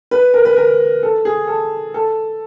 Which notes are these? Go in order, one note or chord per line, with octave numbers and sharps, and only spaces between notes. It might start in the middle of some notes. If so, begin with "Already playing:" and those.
B4
A#4
B4
A#4
A4
G#4
A4
A4